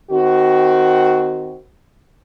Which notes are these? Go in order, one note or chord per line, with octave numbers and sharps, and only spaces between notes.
D#3 C4 F#4